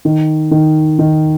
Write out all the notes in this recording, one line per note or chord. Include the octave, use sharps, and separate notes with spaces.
D#3
D#3
D#3